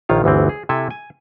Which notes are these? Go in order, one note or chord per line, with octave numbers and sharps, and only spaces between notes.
A#1 D#3 F4 C#5
G1 D2 E3 C4
G#4
C3 E4 A4 G#5
G#5